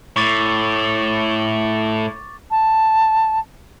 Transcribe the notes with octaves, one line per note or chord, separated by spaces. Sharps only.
A2 C#6 D6 A6
A5